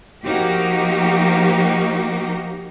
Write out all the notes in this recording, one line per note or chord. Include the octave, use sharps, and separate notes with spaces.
F3 A#3 D#4 F#4 G4